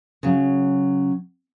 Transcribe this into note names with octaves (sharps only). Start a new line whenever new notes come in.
C#3 F#3